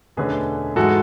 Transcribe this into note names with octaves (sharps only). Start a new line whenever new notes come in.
E1 D2 D3 A3 C#4 G#4 B4
G#2 E3 G#3 F#4 A4